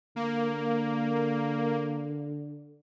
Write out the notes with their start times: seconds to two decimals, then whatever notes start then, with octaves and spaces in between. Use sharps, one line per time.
0.16 D3 A#3